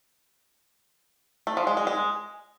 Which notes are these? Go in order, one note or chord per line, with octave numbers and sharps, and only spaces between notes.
A3
F3
G#3
G#3
G#3